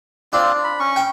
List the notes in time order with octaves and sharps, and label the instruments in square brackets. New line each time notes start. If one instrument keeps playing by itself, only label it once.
[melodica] C4 F4 [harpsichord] D4
[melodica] B5
C#4 C#6
[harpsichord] G5